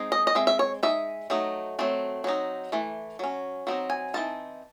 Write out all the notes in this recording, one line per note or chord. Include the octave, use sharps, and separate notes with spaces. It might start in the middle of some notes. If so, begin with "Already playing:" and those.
Already playing: G#3 C4 D#4
D#5
D#5
G#3 C4 E5
E5
C#5
G#3 D#4 E5
F#3 A3 D#4
F#3 A3 C4
F#3 C4 D#4
E3 A3
F#3 C#4
F#3 C4 D#4
G#5
E3 C4 D#4 A5